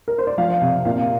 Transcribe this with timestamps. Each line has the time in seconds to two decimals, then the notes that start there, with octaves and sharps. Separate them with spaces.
0.08 A#4
0.18 C5
0.27 D5
0.38 F3 F5
0.61 C3
0.85 A#2 F5